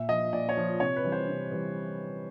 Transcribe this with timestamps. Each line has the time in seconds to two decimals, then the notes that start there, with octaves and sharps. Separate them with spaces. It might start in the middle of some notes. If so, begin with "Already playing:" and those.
Already playing: A#2 E5
0.09 F3 D#5
0.33 A#2 D5
0.49 C#5
0.57 F3
0.80 C3 C#5
0.96 B4
1.04 E3 G3
1.12 C5
1.28 C3
1.52 E3 G3